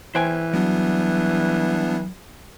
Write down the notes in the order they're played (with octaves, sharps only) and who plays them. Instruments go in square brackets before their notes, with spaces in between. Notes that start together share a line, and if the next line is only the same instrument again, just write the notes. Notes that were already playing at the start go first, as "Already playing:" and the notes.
[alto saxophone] E3 [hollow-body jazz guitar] C5 G5 G#5
[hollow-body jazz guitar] F#3 [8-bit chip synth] G3 B3 D4